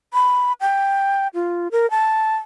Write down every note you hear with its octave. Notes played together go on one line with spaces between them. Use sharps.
B5
G5
F4
A#4
A5